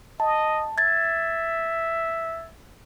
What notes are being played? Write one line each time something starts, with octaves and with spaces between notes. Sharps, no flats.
D#5 A5
E5 G#6 A6